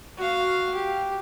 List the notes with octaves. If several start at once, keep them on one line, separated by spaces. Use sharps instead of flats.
F#4 F5
G4